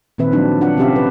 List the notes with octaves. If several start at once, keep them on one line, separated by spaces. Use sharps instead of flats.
A#2 D#3 C4 B4 E5
F3 F#3 C4 D4
D4 F4 F#5
C3 C4 C#4 G4 E5 F5
B4